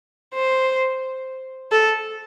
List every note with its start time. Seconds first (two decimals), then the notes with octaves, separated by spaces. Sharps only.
0.35 C5
1.72 A4